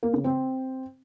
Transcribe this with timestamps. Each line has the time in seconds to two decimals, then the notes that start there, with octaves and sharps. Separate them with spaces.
0.03 A#3
0.14 C#3
0.24 C4